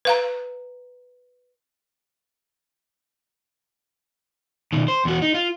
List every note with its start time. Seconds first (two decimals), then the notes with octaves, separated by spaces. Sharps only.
0.05 B4 F5 A#5
4.73 B2 D#3
4.88 C5
5.05 E2 F#4
5.22 D#4
5.34 F4